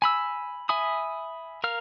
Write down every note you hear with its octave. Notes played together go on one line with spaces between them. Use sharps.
G#5 B5 E6
E5 G#5 B5 D#6
A#4 F5 F6